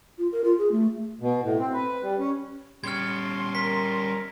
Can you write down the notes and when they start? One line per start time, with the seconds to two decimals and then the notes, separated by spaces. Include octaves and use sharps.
0.18 F4
0.32 A#4
0.44 F4
0.58 G#4
0.71 A3
1.21 B2
1.43 A2
1.59 C4
1.73 B4
2.03 G3
2.19 C#4
2.84 G3 C#4 C6 F6 G#6
3.55 A#4 B6